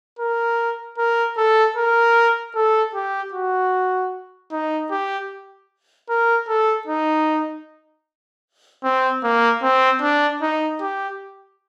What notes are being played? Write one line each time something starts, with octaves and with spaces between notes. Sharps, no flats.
A#4
A#4
A4
A#4
A4
G4
F#4
D#4
G4
A#4
A4
D#4
C4
A#3
C4
D4
D#4
G4